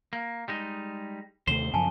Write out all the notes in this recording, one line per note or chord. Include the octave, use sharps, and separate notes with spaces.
A#3
G3 G#3 D#4
D#2 C3 A3 C5 G7
F#2 C#3 F3 G#5 A5